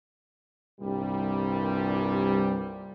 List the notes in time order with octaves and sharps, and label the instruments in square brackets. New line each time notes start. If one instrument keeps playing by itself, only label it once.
[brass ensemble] C2 G2 A#2 G3